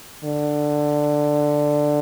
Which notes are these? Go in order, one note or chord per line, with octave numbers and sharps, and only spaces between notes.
D3